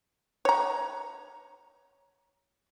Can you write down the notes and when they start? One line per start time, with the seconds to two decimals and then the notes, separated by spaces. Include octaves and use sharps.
0.45 C#5 A#5